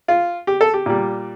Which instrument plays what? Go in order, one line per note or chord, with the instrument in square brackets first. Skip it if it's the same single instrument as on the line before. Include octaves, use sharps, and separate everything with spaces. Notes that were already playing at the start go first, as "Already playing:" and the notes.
[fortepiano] F4
G4
A4
G4
A#2 G3